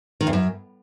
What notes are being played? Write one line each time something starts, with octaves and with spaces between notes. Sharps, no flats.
D#3
E2
F#2